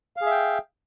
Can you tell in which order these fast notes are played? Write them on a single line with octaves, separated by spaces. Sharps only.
F5 G#4 E5 G5